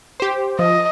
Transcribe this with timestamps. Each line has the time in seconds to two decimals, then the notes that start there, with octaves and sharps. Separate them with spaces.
0.20 G4 C5
0.59 F3 D#5